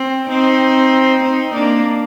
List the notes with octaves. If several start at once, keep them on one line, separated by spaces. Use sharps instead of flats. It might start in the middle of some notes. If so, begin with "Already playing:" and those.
Already playing: C4
C4 D#4
C4 D#4
A#3 D4